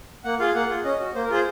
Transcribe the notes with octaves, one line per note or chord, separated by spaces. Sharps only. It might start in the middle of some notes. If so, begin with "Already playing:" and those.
A#3 F#5
F4 G#4 F5
A#3 F#5
F4 G#4
C#4 D#5
F#4
A#3 C5
A#4
F4 G#4 C5